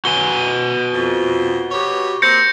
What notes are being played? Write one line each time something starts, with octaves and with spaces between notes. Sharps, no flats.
F#4 B4 G#5 G7
F2
B2 G4 C#5
A#3 C4 G6 A#6 C#7